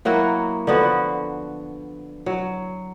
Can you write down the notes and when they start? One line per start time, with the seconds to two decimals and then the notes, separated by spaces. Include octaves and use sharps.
0.05 F#3 A#3 E4 F#4
0.67 D3 F3 B3 F#4
2.26 F#3